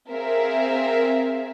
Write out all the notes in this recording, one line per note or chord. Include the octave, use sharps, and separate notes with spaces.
C4 G#4 A#4 E5 F5